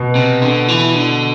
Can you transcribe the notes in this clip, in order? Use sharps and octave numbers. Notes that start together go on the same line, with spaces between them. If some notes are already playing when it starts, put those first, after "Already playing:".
Already playing: B2
C3
D3
E3
D3